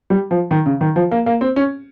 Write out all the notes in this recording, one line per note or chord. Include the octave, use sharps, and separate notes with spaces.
G3
F3
D#3
C#3
D#3
F3
A#3
A#3
C4
C#4